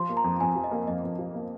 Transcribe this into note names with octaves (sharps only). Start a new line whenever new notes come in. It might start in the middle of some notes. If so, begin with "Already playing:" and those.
Already playing: F3 C6
A#3
A#5
F2
F2 G#5
F3
D#5
A#3
F2 D#5
F2
F3
A#3